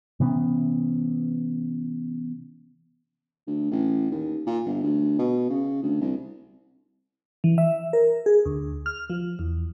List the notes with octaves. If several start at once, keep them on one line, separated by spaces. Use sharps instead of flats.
C3 E3 B3 C#4
D2
A1
D#2
A#2
G1
D2
B2
C#3
D2
C2
E3
E5
A#4
G#4
D2
F6
F3
E2